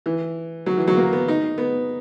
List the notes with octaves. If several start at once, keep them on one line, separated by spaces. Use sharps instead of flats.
E3
F#3
E3
F#3
A#3
B3
D#4
B3